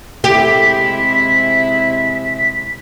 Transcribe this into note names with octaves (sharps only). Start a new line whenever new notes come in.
C3 G#3 E4 G4 B6